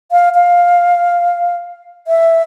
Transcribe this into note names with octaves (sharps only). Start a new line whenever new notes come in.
F5
F5
E5